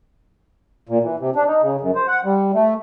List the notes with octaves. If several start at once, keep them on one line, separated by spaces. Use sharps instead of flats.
A#2
E3
C3
D4
D#4
C#3
F#2
C5
F#5
G3
A3